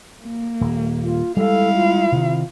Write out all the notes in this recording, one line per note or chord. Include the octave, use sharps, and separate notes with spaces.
A#3
D#1
F4
G3 G#3 E4 A4 F5
F4
C3 D#3